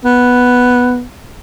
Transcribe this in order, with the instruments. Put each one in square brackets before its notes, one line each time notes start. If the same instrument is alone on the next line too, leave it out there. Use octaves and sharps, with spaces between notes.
[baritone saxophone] B3